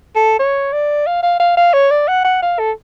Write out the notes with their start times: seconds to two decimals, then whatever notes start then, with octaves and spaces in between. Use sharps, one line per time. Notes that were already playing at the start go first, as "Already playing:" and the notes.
0.16 A4
0.39 C#5
0.73 D5
1.07 F5
1.23 F5
1.40 F5
1.57 F5
1.73 C#5
1.91 D5
2.08 F#5
2.24 F#5
2.42 F5
2.59 A4